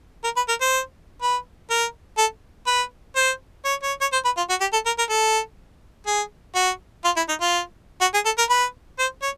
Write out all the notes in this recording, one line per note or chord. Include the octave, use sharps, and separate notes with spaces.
A#4
B4
A#4
C5
B4
A#4
A4
B4
C5
C#5
C#5
C#5
C5
B4
F4
F#4
G4
A4
A#4
A#4
A4
G#4
F#4
F4
E4
D#4
F4
F#4
G#4
A4
A#4
B4
C5
C#5